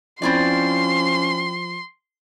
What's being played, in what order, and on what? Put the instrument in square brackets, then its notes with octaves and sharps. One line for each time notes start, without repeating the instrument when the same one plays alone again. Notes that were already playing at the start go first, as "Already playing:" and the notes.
[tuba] F3 [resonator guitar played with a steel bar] C4 E4 D5 [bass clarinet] C#4 [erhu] C6